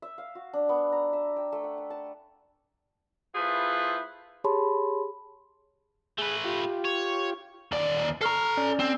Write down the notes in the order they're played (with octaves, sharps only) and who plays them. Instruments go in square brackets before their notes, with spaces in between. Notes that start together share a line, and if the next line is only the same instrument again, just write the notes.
[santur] E5
F5
F#4
D4
B3
A#5
E5
G5
A3
F#5
F#5
A5
[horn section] A3 E4 F4 G#4 B4 C5
[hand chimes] G4 G#4 C#5 A5 B5 C6
[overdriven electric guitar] A3 B4 [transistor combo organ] G#4
[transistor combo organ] F4 G4
[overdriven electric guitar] C#5
[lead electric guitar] D#2 D5
[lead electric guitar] A4 A#5 [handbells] C#6 F6 C7
[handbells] C#4 D5
[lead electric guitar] C4 [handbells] E6